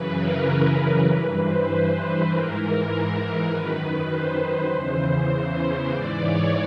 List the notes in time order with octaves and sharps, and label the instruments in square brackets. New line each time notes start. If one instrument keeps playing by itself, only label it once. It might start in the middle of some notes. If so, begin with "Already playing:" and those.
Already playing: [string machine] F#2 C#3 E3 B4
A#4
B4
A#4
G2 E3 B4
C5
B4
G#2 E3 A#4
A#4
F#2 D#3 B4
C5
C5
E2 C#3 E3 C5
G#2 E3 D5
C#5